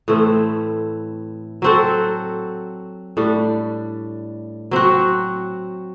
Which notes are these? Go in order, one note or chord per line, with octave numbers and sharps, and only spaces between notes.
A2 E3 A3 C4
F#3 C4 F#4 A4
A2 G3 D4
F#3 C4 F#4